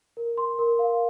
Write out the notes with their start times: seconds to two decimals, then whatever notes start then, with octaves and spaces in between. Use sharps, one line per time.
0.17 A#4
0.37 C6
0.59 A#4
0.79 F5